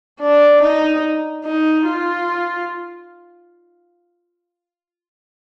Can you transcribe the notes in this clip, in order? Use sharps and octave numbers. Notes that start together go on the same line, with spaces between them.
D4
D#4
D#4
F4